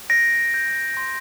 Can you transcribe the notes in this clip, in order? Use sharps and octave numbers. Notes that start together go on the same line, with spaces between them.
G6 A#6 D7
G6
C6